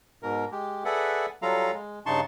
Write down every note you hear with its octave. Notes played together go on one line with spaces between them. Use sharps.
G#2 B2 A#4
G#3 G4
G#4 A4 B4 D5 E5 F#5
F#3 G3 F4 A4 F5 A#5
G#3
G2 C#3 D#4 A5 C6 C#6